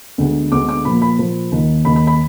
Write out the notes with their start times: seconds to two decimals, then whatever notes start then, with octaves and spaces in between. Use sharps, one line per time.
0.18 D2 D3 G#3 B3
0.52 D2 D3 G#3 B3 D6
0.69 D6
0.85 A#2 F3 A#3 B5
1.02 B5
1.18 A#2 F3 A#3
1.52 D#2 D#3 A#3
1.85 D#2 D#3 A#3 B5
1.96 B5
2.07 B5